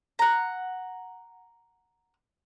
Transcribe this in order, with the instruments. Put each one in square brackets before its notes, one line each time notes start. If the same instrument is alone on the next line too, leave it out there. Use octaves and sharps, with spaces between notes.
[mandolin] F#5 A#5